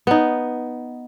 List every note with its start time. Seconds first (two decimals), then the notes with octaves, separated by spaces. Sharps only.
0.07 B3 D#4